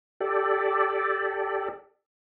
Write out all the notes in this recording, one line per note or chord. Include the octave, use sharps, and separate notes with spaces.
G4 A4 D5